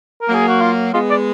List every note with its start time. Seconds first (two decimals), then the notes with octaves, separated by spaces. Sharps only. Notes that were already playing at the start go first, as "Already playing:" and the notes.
0.22 A#4
0.29 F#3 A#3
0.35 G#4
0.48 F#4
0.61 F4
0.93 G#3 B3 F4
1.10 D5